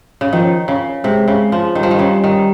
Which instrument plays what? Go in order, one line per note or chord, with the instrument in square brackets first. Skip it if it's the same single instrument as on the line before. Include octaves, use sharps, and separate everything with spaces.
[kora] C#3
[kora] D#3 [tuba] F3
[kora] C#3
[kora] C3 [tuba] G#3
[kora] C#3
F3
[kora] D#3 [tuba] G3
[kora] F3
D#3
C#3
D#3